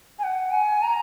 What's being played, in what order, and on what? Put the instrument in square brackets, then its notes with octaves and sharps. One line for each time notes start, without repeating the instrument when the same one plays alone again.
[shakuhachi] G#5
F#5
G#5
A#5